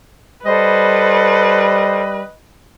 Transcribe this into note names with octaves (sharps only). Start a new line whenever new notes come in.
G3 A4 B4 C5 D#5